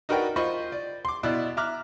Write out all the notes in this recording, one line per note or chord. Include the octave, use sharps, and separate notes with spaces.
D#4 F#4 A#4 B4 D5 G5
F4 C5 D#5 B5 C#6
D5
C6 D6
B2 E4 D5 F#6
E5 A#5 D6 F6 F#6